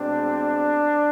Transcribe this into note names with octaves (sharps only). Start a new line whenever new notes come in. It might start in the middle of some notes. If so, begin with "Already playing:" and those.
Already playing: B2 G#3 C4 D4